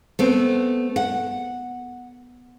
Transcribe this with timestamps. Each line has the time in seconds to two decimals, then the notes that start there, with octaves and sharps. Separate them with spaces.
0.19 A3 B3 C4
0.96 F#5